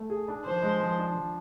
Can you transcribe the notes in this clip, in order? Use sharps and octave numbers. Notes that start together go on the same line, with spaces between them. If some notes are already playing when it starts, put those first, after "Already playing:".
Already playing: A3
G#4
D4
F3 C5
G#3
F3
D4
F3